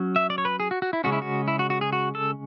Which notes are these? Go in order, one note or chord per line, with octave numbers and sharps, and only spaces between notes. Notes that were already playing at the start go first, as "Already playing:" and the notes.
Already playing: F#3 C#4
E5
D5
C#5
B4
G#4
F#4
F#4
E4
C#3 G#3 C#4 F#4
E4
F#4
E4
F#4
F#4
G#4
F#4
A4